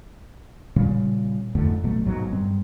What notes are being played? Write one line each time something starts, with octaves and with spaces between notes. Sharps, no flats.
A#2 C#3 G3 C4
F2 G#2 D3 A3
A1 B2 F#3 A3
B1 G#2 B2 F#3
G2 G3 C4